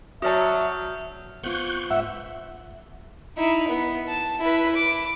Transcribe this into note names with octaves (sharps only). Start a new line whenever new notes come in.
F#3 F#4 D5 E5 A5 D#6 F6 G6
B3 C4 F4 C#6 F#6 G6
G#2 E5 F#5
D#4 E4
B3
A5
E4 B4
D6